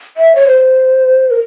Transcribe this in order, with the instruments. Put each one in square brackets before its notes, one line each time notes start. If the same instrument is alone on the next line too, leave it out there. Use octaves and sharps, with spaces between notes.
[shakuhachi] E5
C#5
C5
A#4